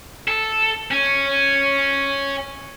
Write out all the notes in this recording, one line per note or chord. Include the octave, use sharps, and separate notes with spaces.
A4
C#4